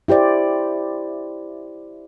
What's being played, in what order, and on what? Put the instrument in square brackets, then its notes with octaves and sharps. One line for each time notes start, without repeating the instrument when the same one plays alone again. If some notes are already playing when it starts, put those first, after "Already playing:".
[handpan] E4 G4 C5 D5